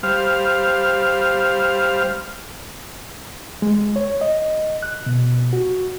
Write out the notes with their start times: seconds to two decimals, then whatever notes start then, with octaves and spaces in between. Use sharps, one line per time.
0.03 G3 C5 F5 F6
3.62 G#3
3.96 C#5
4.21 D#5
4.83 F#6
5.06 B2
5.53 F#4